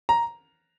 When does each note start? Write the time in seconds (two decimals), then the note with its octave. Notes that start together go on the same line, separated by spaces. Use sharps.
0.09 A#5